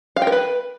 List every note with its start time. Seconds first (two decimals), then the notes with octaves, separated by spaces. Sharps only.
0.16 F5
0.22 G5
0.27 A#4
0.32 B4